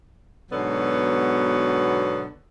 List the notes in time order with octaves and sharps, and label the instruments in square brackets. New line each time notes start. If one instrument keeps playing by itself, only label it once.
[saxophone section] G#2 B2 D3 F#3 B3